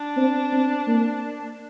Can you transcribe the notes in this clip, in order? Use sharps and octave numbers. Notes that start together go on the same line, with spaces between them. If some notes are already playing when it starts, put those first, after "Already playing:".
Already playing: D4
C4
C4
A#3